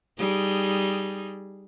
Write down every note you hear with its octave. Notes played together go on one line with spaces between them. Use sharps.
G3 D#4 G#4